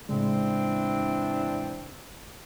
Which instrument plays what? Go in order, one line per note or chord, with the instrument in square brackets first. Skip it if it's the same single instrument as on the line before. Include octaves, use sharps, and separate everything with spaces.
[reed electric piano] A2 C#3 G#3 [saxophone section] E3 C4 D4